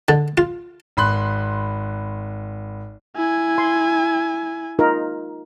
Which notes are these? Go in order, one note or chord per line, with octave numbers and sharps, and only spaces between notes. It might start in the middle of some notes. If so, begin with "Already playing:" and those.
D3
F4
G#1 B5 C6 F#6
E4 G#5
C6
D#4 F4 A#4